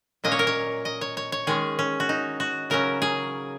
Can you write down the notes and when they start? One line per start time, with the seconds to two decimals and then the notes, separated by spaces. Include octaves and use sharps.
0.24 A#2 F#3 A#3 C#4 D#5
0.32 C#5
0.39 A#4
0.47 C#5
0.85 D#5
1.01 C#5
1.17 C#5
1.32 C#5
1.47 D#3 G#3 C#4 G#4
1.79 C#4
2.00 F#4
2.09 D#4
2.40 F#4
2.70 C#3 F#3 C#4 A#4
3.02 G#4